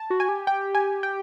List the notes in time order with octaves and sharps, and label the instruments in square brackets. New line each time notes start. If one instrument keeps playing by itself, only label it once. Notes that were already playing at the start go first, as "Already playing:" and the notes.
Already playing: [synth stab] A5
[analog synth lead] F#4
[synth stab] G#5
[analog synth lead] G4
[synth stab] G5
G#5
G5